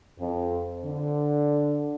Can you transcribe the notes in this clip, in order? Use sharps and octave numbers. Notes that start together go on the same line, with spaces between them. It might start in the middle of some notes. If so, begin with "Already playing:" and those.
F2
D3